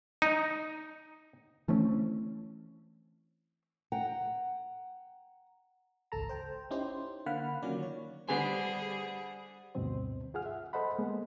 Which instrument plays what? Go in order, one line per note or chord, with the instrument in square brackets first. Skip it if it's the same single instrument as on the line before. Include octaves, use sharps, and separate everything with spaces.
[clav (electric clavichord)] D#4
[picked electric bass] E3 A3 C4 C#4
[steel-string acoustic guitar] F#5 G5 A#5
[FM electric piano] G#1 C#2 A4 A5 A#5
C5 G5
C#4 D#4 E4 G4 C5
D3 A#3 F5 F#5 B5 F6
D#3 F#3 A#3 C#4 F4 D5
C#5
[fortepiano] D3 B3 [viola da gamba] G3 G#4 [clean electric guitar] G4 C5 G#5
[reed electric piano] D2 G2 B2 C4 C5
F4 G#4 F#5 F6
E5
A4 C5 D#5 F#5 B5
G#3 A#3 B3